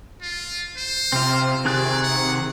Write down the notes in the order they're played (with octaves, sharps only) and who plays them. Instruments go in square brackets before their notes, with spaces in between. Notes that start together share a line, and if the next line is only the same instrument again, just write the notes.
[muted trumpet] F4
C5
[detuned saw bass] C3 [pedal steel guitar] C4 F4
[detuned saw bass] C3 [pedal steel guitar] D#3 G#4 F#6 [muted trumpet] D5
[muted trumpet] F#5